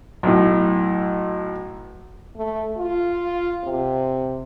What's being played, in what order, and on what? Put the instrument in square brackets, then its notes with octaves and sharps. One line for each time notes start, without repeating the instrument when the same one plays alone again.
[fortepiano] B1 A2
[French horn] A3
F4
C3